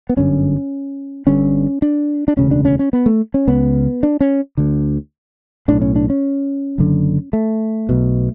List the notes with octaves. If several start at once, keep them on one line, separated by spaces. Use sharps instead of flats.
B3
G1 F#2 D3 C#4
G1 G2 D3 C#4
D4
D4
E1 D2 C#3 C#4
D4
C#4
C#4
B3
A3
C#4
C#2 C#3 B3
D4
C#4
D2 D3
B1 A2 D4
C#4
D4
C#4
F#1 F#2 D3
A3
B1 B2